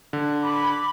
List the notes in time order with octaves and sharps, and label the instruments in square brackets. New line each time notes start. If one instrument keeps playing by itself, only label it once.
[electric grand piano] D3
[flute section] B5 D6